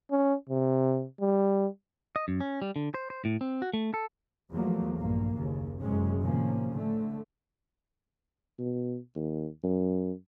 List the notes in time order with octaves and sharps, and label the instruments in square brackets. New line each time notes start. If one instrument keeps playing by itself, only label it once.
[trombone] C#4
C3
G3
[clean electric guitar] D#5
F#2
C#4
G3
D3
C5
C5
A2
C4
F#4
A3
A4
[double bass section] E2 F3 F#3 A3 A#3
A#1 G2 A#3
F#1 D#2 C#3
F#1 F#2 A2 C3 G#3 C#4
A2 C3 D#3 F3 A#3 C#4
A2 D3 A3
[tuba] B2
D#2
F#2